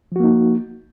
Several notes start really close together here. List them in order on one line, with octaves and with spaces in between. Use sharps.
F3 F#4 A#3 D#4